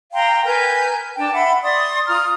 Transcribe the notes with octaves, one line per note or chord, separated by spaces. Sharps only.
F5 G5 A#5 C6
A#4 B4 G#5 G6
D4 G5 A5
E5 F#5 B5 C6
D5 C6 D#6
F4 A#5 D#6 F6